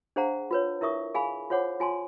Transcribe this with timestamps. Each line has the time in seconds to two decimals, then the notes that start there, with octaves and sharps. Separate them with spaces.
0.16 D4 G#4 C5 F5 F#5 A#5
0.51 F4 B4 C#5
0.81 E4 A#4 E5 C#6 D#6
1.14 G#4 F5 G#5 B5
1.50 F4 C5 C#5 F#5 D6
1.80 F4 G#5 A5 C6